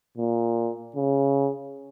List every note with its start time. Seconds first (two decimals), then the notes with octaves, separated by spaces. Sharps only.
0.17 A#2
0.96 C#3